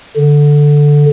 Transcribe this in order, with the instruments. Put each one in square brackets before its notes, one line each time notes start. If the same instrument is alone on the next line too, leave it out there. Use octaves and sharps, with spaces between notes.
[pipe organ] D3